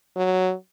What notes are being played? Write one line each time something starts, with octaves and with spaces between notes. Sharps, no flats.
F#3